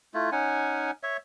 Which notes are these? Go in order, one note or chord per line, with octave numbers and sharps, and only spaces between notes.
A3 E4 F4
C#4 D#4 F#5 G#5
C#5 E5